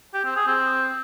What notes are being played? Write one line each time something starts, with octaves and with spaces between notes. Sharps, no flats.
G4
C4
G#4
C4